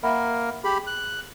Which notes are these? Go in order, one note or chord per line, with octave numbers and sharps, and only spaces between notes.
A#3 A#4 E5 F#5 B5
G4 G#4 B5
F#6